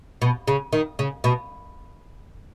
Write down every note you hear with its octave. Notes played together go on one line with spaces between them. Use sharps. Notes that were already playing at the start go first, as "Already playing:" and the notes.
B2
C#3
D#3
C#3
B2